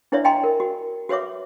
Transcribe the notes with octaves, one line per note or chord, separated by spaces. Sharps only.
D4 E4 B4 C#5 D5 E5
D#5 G5 G#5 A#5 C6
A#4
F#4
F#4 B4 C#5 E5 D6